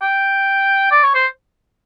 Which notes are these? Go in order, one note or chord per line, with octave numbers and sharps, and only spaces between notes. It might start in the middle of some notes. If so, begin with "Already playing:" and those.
G5
D5
C#5
C5